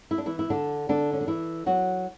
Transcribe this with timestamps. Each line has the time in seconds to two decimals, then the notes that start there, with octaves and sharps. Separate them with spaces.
0.11 E4
0.18 D4
0.26 E3 E4
0.39 E4
0.50 D3 D4
0.89 D3 D4
1.13 C#4
1.21 D4
1.28 E3 E4
1.66 F#3 F#4